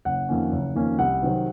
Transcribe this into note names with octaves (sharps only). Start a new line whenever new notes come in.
F#1 F#5
F2 D#3 A#3 C#4
F#1
F2 D#3 A#3 C#4
C2 F#5
C3 D#3 F#3 C4